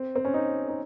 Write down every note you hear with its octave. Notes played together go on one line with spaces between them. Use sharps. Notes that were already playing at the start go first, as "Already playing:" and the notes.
Already playing: C4
C4
C#4
D#4
D#4